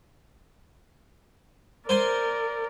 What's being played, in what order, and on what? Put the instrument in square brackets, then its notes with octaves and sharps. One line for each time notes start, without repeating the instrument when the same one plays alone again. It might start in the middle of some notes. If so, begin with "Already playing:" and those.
[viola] A#4 D5 [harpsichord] C5 G#5 C6